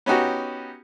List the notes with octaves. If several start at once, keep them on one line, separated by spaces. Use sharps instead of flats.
B3 C#4 D#4 F#4 G4